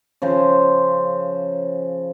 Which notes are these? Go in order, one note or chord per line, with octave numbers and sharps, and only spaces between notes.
C#3 F3 C5